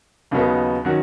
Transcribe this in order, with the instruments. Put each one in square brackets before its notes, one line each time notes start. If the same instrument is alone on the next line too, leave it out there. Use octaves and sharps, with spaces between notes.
[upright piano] D#2 C#3 F#3 B3 D#4
D#3 F#3 C#4 F#4